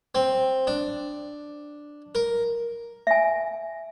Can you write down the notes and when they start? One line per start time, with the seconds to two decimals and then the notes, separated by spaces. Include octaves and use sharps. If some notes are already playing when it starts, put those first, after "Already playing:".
0.15 C4
0.67 D4
2.15 A#4
3.07 E5 G#5